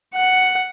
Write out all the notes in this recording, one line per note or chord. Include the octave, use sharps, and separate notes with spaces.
F#5